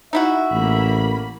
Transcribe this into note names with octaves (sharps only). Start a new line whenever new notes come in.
D#4 E4 F#4 E5
A1 A#3 B5